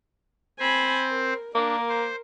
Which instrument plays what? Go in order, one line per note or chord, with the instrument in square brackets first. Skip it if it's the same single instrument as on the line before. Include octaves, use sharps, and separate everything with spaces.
[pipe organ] C4 C5 [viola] G#5 B5
[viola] A#4
[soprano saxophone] A#3 [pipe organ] D4 [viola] A#4
[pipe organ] C5